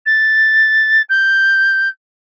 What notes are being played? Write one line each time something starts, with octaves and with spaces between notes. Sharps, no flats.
A6
G6